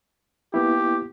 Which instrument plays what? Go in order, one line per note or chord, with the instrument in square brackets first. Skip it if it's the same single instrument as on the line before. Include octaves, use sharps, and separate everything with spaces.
[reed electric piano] A#3 B3 E4 [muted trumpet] G4